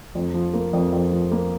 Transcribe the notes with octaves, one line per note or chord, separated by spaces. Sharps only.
F2
F3
A#3
F2
F2
F3
A#3